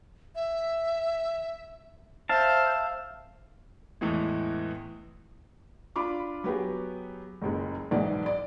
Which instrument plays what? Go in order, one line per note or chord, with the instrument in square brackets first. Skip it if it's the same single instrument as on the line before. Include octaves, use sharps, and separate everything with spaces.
[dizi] E5
[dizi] C5 [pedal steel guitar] E5 F5 A5
[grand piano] E2 A2 E3 G#3
[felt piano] D4 F4 B5 D6
F#3 B3 G4 G#4
F#1 C#2 G#3
B1 G#2 E3 D5
D5